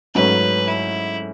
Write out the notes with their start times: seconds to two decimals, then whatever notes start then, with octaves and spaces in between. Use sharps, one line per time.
0.15 G#2 F#3 A3 C#4 B4
0.67 E4